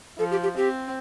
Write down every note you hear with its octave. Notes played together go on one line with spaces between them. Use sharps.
F3 A4
G4
G4
C4 G4